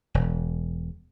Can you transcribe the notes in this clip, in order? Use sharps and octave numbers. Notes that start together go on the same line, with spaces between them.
E1